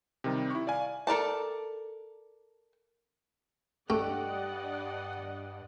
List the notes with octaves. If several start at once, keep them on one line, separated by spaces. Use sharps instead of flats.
C3 D#3 G3
E4 C#6
D5 F5 G#5
A4 A#4 D5 A5
G2 A3 G4 D5 D#5 F#5